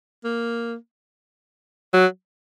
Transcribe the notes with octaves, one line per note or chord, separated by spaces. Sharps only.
A#3
F#3